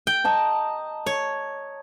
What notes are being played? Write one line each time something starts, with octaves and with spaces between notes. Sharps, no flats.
G5
D#5 A5 A#5
C#5